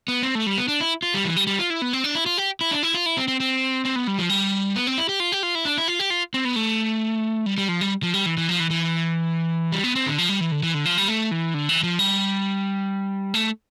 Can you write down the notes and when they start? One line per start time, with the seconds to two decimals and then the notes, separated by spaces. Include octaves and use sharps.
0.08 B3
0.23 C4
0.35 A3
0.46 G3
0.58 B3
0.68 D4
0.80 E4
1.02 F4
1.14 G3
1.25 E3
1.36 G3
1.47 G3
1.59 F4
1.70 E4
1.82 B3
1.93 C4
2.04 D4
2.15 E4
2.26 F4
2.38 G4
2.61 E4
2.71 D4
2.83 E4
2.94 F4
3.06 E4
3.17 C4
3.28 C4
3.40 C4
3.85 C4
3.96 B3
4.07 G3
4.18 F3
4.29 G3
4.76 B3
4.87 C4
4.98 E4
5.09 G4
5.20 F4
5.32 G4
5.43 F4
5.55 E4
5.65 D4
5.78 E4
5.88 F4
5.99 G4
6.10 F4
6.34 C4
6.45 B3
6.56 A3
7.46 G3
7.58 G3
7.69 F3
7.81 G3
8.03 F3
8.14 G3
8.26 E3
8.38 E3
8.49 F3
8.60 E3
8.70 E3
9.72 G3
9.84 B3
9.96 C4
10.06 D3
10.18 F3
10.29 G3
10.41 E3
10.52 D3
10.63 E3
10.74 D3
10.85 F3
10.98 G3
11.08 A3
11.31 E3
11.54 D3
11.69 E3
11.83 F3
11.99 G3
13.34 A3